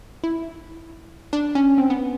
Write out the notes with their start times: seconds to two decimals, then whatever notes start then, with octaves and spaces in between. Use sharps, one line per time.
0.24 E4
1.33 D4
1.55 C#4
1.78 C4
1.90 B3